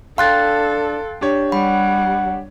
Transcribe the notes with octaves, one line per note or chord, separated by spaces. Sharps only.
D4 A4 F5 G5 C6 F#6 A6
D4 G4 C#5
G3 F#5 B5